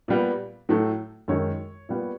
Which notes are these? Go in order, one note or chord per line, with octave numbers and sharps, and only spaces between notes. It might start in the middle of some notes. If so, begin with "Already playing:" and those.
A#2 G3 B3
A2 F#3 A3
F#2 D#3 G#3 C#5
A#2 G3 B3